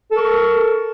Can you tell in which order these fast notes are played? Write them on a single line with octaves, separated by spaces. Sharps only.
A4 A#4 C#6